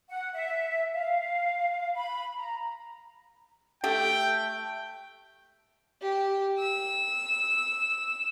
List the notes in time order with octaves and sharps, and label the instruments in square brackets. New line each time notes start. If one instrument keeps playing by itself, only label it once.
[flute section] F#5
E5
F5
B5
A#5
[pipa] A3 G4 [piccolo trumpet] G5
[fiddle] G4
E6